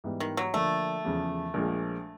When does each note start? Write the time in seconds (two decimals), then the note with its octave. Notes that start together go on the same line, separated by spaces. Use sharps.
0.04 G#2 E3 G3 B3
0.20 D#3
0.37 F#3
0.53 D3 F3 A3 A#3 D4
1.05 E2 C#3 F3
1.54 A#1 A#2 F3 G#3